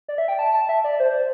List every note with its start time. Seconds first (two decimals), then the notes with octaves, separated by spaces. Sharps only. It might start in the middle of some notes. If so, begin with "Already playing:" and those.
0.08 D5
0.18 E5
0.28 G5
0.39 A5
0.54 A5
0.69 E5
0.84 D5
1.00 C5
1.10 C5